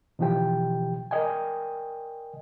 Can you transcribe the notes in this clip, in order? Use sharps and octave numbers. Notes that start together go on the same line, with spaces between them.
B2 D3 E3 F3 G4 G5
A#4 D5 D#5 G5 G#5